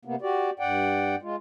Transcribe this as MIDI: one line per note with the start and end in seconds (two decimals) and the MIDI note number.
0.05 0.15 48
0.05 0.15 58
0.05 0.15 59
0.22 0.50 66
0.22 0.50 67
0.22 0.50 74
0.59 1.15 43
0.59 1.15 74
0.59 1.15 78
0.59 1.15 79
1.22 1.36 56
1.22 1.36 65